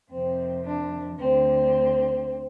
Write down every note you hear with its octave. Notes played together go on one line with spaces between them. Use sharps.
F2 C3 D#3 C4
D4
D2 D3 C4